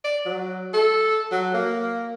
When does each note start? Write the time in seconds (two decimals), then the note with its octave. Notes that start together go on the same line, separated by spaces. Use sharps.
0.04 D5
0.26 F#3
0.74 A4
1.31 F#3
1.54 A#3